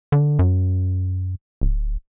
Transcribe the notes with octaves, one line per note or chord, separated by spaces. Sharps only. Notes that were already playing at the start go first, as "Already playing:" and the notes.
D3
F#2
D1